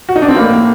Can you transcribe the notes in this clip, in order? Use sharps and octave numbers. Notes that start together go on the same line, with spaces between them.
F#4
D#4
D4
C4
A2 A#3